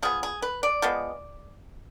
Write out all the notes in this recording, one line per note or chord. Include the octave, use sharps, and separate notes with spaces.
F3 B3 G#4
G#4
B4
D5
F3 G#3 B3